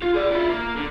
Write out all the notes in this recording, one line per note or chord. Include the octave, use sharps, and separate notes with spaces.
F4
G#4 D5
E4 F4
A#3
D3